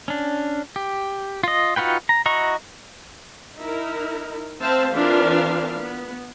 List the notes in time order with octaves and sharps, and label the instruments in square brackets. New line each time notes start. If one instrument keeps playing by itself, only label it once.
[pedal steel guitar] C#4 D4
G4
F4 D#5
D#4 F4 F#4 B4 G5
A#5
E4 F#4 D#5 A#5 C#6
[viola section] D#4 E4 A#4
C4 C5 E5 F5 A5
E3 C4 D4 F4 A#4 F5
B3